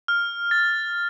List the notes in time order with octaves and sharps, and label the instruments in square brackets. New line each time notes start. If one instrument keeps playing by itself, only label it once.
[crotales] F6
A6